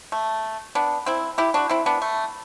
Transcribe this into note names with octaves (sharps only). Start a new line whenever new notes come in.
A3
B3 D4
C4 E4
E4 G4
D4 F#4
C4 E4
B3 D4
A3